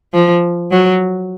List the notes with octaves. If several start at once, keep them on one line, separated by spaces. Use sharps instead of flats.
F3
F#3